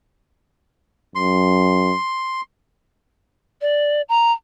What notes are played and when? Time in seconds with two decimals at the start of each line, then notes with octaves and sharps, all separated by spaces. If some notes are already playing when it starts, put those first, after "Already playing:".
1.15 F#2 C6
3.61 D5
4.09 A#5